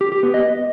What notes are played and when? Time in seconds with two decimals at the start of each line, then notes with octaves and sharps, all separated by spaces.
0.01 G4
0.12 G4
0.23 B3
0.34 D#5